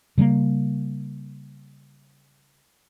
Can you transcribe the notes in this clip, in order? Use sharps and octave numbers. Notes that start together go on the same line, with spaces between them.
C#3 G3 A3 A#3